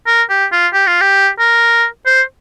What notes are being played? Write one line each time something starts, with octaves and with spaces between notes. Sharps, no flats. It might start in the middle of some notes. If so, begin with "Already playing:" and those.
A#4
G4
F4
G4
F4
G4
A#4
C5